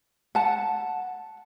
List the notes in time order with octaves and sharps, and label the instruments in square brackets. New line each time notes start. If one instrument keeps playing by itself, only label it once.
[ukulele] F#5 A5